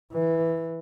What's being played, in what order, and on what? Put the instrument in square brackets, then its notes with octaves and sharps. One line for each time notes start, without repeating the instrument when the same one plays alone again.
[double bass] E3